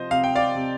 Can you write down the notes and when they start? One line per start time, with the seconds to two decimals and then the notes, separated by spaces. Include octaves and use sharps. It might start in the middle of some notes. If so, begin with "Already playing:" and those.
Already playing: C3 F3 C5 D#5
0.11 C3 F5
0.24 G5
0.35 D5 F5
0.55 C3